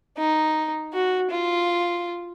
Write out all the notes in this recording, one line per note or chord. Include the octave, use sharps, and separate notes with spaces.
D#4
F#4
F4